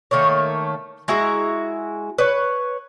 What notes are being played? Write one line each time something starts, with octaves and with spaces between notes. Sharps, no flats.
D#3 A3 A#3 C#5
G#3 E4 F#4 A#5
B4 C#5